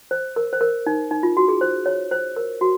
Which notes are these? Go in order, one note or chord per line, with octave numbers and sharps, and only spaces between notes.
C5
A#4
C5
A#4
D#4
D#4
F4
F#4
G#4
C5
C#5
C5
A#4
F#4